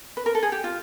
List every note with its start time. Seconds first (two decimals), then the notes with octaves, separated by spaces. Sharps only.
0.17 B4
0.26 A#4
0.35 A4
0.43 G#4
0.52 G4
0.64 F4